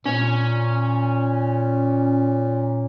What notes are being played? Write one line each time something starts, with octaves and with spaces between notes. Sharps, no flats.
A#2 C#4